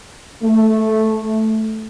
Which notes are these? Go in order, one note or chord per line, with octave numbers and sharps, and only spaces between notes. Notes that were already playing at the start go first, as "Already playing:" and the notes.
A3